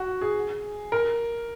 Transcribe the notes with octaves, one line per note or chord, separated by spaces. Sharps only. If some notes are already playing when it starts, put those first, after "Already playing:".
Already playing: F#4
G#4
A#4